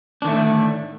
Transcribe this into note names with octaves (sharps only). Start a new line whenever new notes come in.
A2 D3 D#3 A3 D4